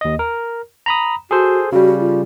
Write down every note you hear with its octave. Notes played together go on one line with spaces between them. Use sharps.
D#2 D#5
A#4
A#5 B5 D#6
F#4 G#4 A4 C5
C#3 G3 F#4
F4